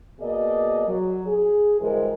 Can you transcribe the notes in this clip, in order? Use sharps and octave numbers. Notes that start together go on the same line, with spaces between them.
B2 A#3 G#4 D5 D#5
F#3
G#4
D2 G2 E3 G#3 A#4 C5